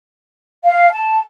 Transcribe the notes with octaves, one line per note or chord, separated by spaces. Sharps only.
F5
A5